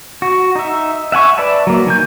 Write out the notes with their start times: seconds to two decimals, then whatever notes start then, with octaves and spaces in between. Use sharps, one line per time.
0.22 F#4
0.55 D#4 E5
1.12 E5 F#5 G#5 C#6
1.38 B4 D5 E5 A5
1.67 F#3 A#3
1.86 D#3 G#5 G6